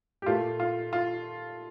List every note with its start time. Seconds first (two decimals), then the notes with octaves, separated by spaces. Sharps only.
0.22 G4
0.26 A#2 A3 F4
0.60 F4
0.93 F4